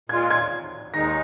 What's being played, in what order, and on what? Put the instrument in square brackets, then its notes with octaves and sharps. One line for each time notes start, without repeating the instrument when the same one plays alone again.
[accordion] A#2 G#3 F4 [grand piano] G#6
[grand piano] G#6
[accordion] D#2 D#3 G#3 D#4 [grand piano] A#6